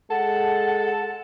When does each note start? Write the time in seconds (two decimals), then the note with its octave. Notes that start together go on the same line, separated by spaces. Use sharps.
0.10 G#3 A4 F#5 A5